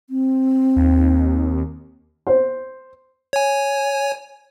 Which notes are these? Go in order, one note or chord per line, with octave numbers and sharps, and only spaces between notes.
C4
D#2
C5
C#5 G#5